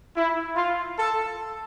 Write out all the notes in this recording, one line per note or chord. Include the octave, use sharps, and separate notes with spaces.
E4
F4
A4